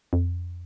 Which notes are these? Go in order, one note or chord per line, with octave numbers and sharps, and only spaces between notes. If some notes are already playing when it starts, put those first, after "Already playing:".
F2